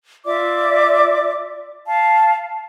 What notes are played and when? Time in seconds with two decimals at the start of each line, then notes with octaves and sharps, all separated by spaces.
0.25 F4 D5 E5 D6
1.85 F5 A5